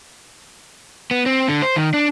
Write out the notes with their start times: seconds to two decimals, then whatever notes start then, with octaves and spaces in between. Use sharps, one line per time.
1.11 B3
1.26 C4
1.48 D3
1.62 C5
1.76 D#3
1.94 D4